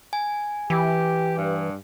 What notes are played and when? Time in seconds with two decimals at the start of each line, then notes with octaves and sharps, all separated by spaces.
0.13 G#5
0.70 E3 G4
1.38 G2